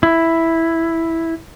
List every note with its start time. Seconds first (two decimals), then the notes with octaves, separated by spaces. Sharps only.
0.03 E4